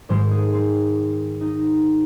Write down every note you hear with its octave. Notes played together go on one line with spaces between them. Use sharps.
G#2 D#3 G#3 C5
G#4
C4
D#4